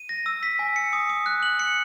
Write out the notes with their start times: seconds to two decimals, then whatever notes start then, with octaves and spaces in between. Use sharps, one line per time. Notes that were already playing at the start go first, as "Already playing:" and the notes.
Already playing: D#7
0.09 A#6
0.26 E6
0.43 B6
0.59 G#5
0.76 C#7
0.93 D#6
1.10 D#6
1.26 F#6
1.43 F#7
1.59 C#7